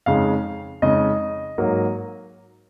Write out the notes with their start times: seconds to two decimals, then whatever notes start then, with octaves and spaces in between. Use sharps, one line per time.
0.06 F2 C#3 G#3 D#4 F5
0.82 F2 C#3 G#3 D#4 D#5
1.58 G#2 F#3 A#3